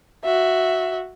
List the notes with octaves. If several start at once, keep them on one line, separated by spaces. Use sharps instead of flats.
F#4 E5